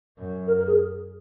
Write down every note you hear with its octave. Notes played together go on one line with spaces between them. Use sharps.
F#2
A#4
A#4
G#4